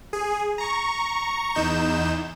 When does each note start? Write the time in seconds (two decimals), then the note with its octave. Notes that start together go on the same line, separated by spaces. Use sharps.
0.13 G#4
0.58 A#5 C#6
1.55 E2 D#4 G6 E7